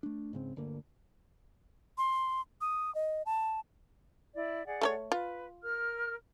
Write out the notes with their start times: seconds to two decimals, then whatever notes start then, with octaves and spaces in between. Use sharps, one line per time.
0.03 A3 D4
0.33 G#2 C#3 C4
0.56 G1 D2 D3 A#3
1.98 C6
2.61 D#6
2.95 D#5
3.26 A5
4.35 E4 D5
4.65 G#4 D5 F#5
4.81 A3 A4 C#5
5.12 F4 B4
5.63 A#4 F6